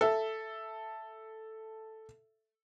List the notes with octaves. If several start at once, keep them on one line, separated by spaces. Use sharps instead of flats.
A4 E5